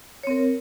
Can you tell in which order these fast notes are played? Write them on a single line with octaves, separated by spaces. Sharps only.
C#5 C4 A#4